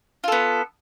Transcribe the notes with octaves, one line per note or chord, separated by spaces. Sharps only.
B3 F4 A4